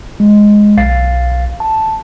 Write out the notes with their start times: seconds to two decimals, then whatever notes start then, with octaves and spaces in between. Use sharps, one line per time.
0.20 G#3
0.77 B1 F5 A6 C7
1.60 A5